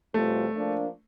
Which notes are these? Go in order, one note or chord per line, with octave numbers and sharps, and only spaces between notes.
E2 B2 G3 A3 C4 F4
F3 A#3 D4